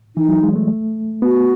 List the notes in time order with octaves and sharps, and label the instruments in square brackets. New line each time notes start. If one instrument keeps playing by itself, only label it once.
[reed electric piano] E3 [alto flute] D#4
[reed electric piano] F#3
G#3
A3
[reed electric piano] B3 [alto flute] F#4